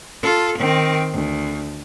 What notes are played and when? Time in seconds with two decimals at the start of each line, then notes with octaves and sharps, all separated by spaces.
0.23 F4 A4
0.59 D#3 C4
1.13 D2